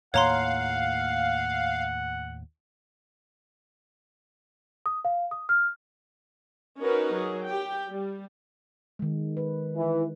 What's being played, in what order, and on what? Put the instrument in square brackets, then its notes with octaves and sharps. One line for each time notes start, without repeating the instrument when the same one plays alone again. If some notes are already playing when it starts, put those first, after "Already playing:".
[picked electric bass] D#2 A2 A#3 [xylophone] C#5 A#5 C6 [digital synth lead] F5 [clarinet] F#5
[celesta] D#6
F5
D#6
F6
[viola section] C#4 D#4 F#4 A#4 B4
F#3 G#4
G4 G5
G3
[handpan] D#3 G#3
B4
[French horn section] E3